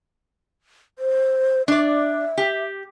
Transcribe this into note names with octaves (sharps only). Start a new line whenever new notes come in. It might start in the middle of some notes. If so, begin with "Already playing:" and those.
C5
D4 D5 E5
G4